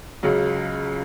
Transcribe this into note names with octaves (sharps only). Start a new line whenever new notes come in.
C#2 C#3 F#3